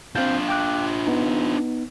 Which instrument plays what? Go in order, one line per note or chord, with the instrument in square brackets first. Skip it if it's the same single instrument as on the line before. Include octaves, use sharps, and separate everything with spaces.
[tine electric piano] C4 F5 G6 [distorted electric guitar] D4 F4
[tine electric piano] G5 D6 F#6
B3 D#4